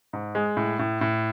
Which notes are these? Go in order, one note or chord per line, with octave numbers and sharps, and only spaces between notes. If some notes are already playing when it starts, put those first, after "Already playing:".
G#2
G#3
A2
A2
A2